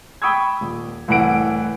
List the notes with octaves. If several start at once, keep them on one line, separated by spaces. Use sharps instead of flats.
G5 B5 C#6 D#6 E6 G#6
D#1
C2 A2 E3 F#5 D7